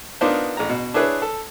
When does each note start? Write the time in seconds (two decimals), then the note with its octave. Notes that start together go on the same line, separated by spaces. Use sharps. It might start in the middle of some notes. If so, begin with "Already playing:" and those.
0.21 B3 D4 D#4 F4 A#4 C5
0.57 A1 A#5
0.69 B2
0.94 D4 E4 G#4 B4 C#5
1.22 A4